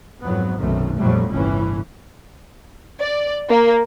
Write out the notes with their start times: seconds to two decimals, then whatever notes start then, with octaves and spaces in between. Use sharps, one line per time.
0.22 F2 G#2 F#3 B3
0.58 B1 F#2 C3 D#3 A3
0.97 A#1 F2 F#3 G3 A3
1.30 G1 C2 A2 E3 C#4
3.01 D5
3.49 A#3